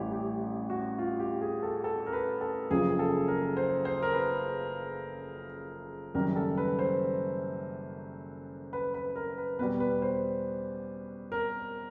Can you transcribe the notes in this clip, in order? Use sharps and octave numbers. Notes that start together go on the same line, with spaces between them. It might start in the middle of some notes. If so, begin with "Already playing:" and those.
Already playing: A1 A2 E3 G3 E4 G4
G4
F#4
F4
G4
G#4
A4
A4
A#4
B4
A4
F#1 F#2 C#3 F3 G#4
G#4
A4
A#4
C5
C5
A#4
B4
F#1 F#2 D#3 G3 A#4
A4
B4
C5
B4
B4
A#4
B4
E2 B2 G3 B4
B4
C5
A#4